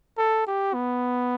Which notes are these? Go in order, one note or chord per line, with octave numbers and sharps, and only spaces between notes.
A4
G4
B3